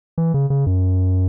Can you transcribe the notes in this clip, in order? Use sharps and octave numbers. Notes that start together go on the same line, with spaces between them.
E3
C#3
C#3
F#2